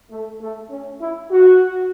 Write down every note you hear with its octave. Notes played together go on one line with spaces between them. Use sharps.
A3
A3
C#4
E4
F#4